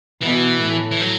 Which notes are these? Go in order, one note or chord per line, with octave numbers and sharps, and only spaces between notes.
B2 E3 B3
A2 A3
E3
F#3